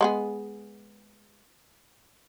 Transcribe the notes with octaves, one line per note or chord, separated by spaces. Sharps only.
G#3 B3 G#4